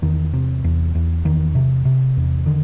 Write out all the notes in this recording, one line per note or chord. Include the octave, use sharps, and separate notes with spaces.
E2 D#3
C3
E2
E2
E2 D#3
C3
C3
E2
D3 D#3